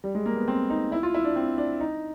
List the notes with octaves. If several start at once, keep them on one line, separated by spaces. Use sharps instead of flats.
G3
G#3
A#3
B3
C4
D#4
E4
F4
E4
D4
C4
D4
D#4